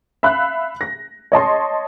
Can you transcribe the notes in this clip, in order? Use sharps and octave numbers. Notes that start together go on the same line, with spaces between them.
E5 F5 B5 F#6
A#6
C#5 D#5 A5 C6